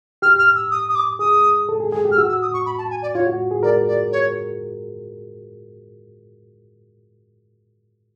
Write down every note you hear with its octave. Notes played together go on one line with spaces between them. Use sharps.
G4 F6
F6
E6
D#6
D#6
D6
G#4 D#6
A4
G#4
G#4
G4
F6
F#4 E6
E6
D#6
C#6
B5
A5
G#5
D5
F4 C#5
F#4
G#4
A#4 D5
D5
C#5